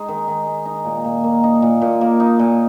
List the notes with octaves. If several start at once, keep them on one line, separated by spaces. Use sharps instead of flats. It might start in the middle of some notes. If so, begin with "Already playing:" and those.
Already playing: G#3 D#4
D#3
D#3
G#3
D#4
A#2
A#2
A#3
D#4
A#2
A#2
A#3
D#4
A#2